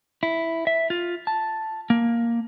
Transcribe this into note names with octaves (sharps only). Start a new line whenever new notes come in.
E4
E5
F4
A5
A#3